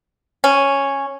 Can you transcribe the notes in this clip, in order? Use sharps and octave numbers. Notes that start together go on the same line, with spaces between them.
C#4